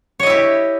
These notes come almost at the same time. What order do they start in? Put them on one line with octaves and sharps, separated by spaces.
C#5 D#5 E4 G4